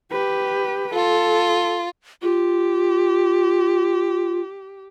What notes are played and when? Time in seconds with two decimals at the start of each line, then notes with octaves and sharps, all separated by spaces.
0.12 G4 B4
0.94 F4 A4
2.22 F4 G4